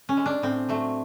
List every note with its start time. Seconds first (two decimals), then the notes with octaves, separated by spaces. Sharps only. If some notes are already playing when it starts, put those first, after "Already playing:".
0.09 C#4
0.17 G#3
0.26 D4
0.42 A2 C4
0.69 F#3 A3